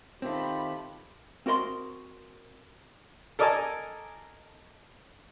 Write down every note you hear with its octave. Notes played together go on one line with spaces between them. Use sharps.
D#3 A3 C4 F4 G4 B5
C4 F#4 A#4 D#5 C6
A4 A#4 D5 D#5 G#5 A5